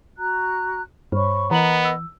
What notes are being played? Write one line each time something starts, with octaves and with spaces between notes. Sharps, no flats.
F#4 A#5 F#6
G2 C5 C#5 B5 C#6
E3 B3 A#4 D#5 A#5 F#7
E6